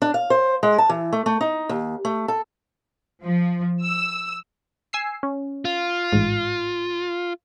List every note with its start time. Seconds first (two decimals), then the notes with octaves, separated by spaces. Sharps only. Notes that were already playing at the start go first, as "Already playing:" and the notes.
0.02 D4
0.14 F5
0.30 C5
0.63 G#3
0.78 A5
0.89 E3
1.13 A3
1.26 A3
1.41 D#4
1.69 D#2
2.05 A3
2.28 A4
3.23 F3
3.83 E6
4.93 G#5 E6 C7
5.23 C#4
5.65 F4
6.13 A1 G#2